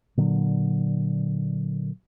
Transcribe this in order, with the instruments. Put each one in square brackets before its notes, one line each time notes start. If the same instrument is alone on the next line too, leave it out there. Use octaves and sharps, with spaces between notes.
[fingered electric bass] A#2 D3 F#3